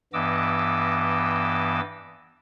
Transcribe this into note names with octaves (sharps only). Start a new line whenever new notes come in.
G2 E3 B3 D#5 D6 E6